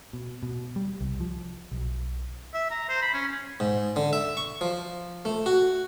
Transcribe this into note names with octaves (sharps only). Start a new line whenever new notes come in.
B2
B2
G3
C2
F3
B1
E5
A#5
C5
B5
C#4
G#2
D3
E5
C#6
F3
A3
F#4